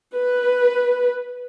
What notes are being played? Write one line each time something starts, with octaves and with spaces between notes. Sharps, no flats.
B4